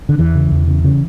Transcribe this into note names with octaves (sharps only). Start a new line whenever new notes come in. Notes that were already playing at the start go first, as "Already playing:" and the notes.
D3
E2 E3
C#3
E2
C#3
C#3